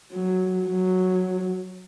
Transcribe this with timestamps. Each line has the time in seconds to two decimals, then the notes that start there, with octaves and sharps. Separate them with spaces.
0.12 F#3
0.65 F#3